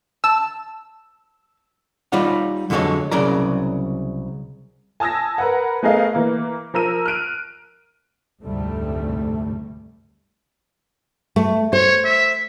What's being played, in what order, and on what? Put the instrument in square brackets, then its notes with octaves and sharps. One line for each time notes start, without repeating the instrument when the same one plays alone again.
[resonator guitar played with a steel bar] A5 [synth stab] E6
[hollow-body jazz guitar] G3 D#4 F4 C#5 F#5
F2 D3 F#3 G#3 A4 C#5
C2 C#3 F#3 A#4 D5 A#5
[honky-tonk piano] G#5 A5 D#6 E6 G#6 A#6
A#4 B4 F#5
A3 B3 G#4 A#4 D#5 F5
E3 A#3
F3 A#4 E6 D#7
F6 F#6 D7 D#7
[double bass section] F1 D2 G#2 C3 G3 A3
[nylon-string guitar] A3
[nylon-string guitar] C5 [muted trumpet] C#5
[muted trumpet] E5